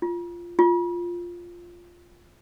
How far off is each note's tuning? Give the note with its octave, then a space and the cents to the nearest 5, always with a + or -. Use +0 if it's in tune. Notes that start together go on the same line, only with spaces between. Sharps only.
F4 -10
F4 +0